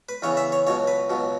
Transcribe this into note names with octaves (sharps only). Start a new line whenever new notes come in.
B4
E2 C#3 E3 C#5
E5
C#5
C#2 B2 F#3 C#5
B4
C#2 B2 F#3